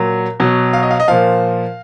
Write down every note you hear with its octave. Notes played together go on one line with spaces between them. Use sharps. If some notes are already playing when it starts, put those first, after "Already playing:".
Already playing: A#2 F#3
B2 F#3
F5
D#5
F5
D#5
A#2 F3 F5